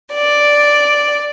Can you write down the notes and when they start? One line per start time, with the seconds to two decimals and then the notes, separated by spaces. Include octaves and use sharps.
0.13 D5